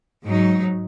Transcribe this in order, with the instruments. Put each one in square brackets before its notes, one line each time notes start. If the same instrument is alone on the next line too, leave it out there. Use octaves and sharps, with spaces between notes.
[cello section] G#2 F#3 D#4